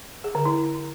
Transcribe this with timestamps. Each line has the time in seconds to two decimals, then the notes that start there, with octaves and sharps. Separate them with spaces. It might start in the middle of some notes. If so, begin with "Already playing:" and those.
0.24 G#4
0.35 D3
0.46 E4